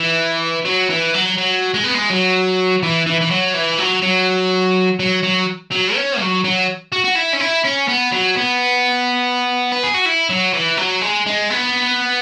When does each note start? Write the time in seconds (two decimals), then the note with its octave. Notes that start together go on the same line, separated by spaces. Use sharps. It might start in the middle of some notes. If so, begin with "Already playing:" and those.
Already playing: E3
0.65 F#3
0.89 E3
1.14 F#3
1.38 F#3
1.74 G#3
1.84 B3
1.95 G#3
2.10 F#3
2.83 E3
3.06 E3
3.21 E3
3.31 F#3
3.54 E3
3.79 F#3
4.03 F#3
5.00 F#3
5.23 F#3
5.71 F#3
5.96 C#4
6.20 F#3
6.44 F#3
6.92 F#4
7.05 F#4
7.16 E4
7.33 C#4
7.41 E4
7.65 C#4
7.88 B3
8.12 F#3
8.37 B3
9.72 B4
9.83 G#4
9.94 F#4
10.05 E4
10.30 F#3
10.54 E3
10.77 F#3
11.01 G#3
11.26 G#3
11.50 B3